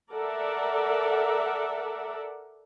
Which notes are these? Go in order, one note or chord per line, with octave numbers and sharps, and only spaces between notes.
A4 A#4 D5 E5 F#5